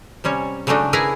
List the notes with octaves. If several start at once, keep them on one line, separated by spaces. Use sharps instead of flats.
C3 G3 C#4 C#5
C#3 F#3 G#3 A3 D4 D#4
E4 G#4 A#4 B4 G#5 A#5